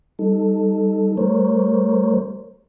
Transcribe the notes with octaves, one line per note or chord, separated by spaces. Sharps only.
G3 D#4 A4
G3 A3 A#4 C5 C#5